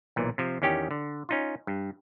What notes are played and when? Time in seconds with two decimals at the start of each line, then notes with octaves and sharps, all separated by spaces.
0.16 B1 A#2 E3
0.38 C3 F3
0.62 E2 D#3 C#4 G4 G5
0.91 D3
1.29 C#4 D#4 F4
1.67 G2